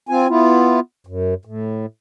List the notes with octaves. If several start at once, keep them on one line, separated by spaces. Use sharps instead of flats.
C4 F4 G#5
B3 E4 F4
F#2
A2